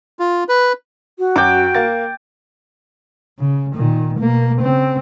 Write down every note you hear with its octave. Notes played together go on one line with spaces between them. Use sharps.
F4
B4
F#4
F#2 G5 D6
A#3 A#4 A6
C#3
A#2 D#3
B2 A#3
C#3 C4